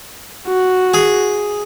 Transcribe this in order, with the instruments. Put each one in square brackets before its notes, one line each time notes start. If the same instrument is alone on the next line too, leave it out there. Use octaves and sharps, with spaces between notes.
[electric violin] F#4
[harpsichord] G#4